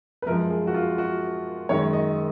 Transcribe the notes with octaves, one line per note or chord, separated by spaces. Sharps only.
B4
F#2 F3 G#3 A#4
G#4
F#4
F4
F#4
F#2 D#3 G#3 C#5
D#5